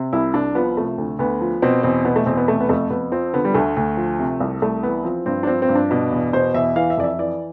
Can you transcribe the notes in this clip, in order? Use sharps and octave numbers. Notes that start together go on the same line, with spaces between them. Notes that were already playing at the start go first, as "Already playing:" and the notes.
Already playing: C3
C2 E4
C2 D4
F3 B3
C3 A3
D2
D2 B3
F3
B2 C4
E2 C4
B2 B3
A3
E2 C4
B3
C3 A3
B3
F2 A3
F2 B3
F3 C4
D3 B3
G3
D2 A3
D2
F3
C3
C2
C2 A3
E3 B3
F3 C4
G2 C4
D4
F3 C4
C4
G2
D4
B2
E2
B2 C5
E2 E5
E3 F5
E5
F2 D5
E5
E3 D5